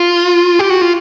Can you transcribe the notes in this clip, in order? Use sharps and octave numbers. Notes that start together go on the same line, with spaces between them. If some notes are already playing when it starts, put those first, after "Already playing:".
Already playing: F4
G4
F#4
F4